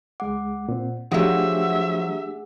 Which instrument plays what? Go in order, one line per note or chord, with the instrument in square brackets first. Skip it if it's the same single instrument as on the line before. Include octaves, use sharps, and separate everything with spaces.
[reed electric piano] C#2 G#3 D6 [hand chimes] F#5
[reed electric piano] A#2 C4
[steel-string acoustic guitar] F3 F#3 [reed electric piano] A3 D4 G4 [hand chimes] G#4 F#5 [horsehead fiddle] E5